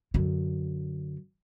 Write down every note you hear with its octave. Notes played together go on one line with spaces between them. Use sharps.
F#2 D3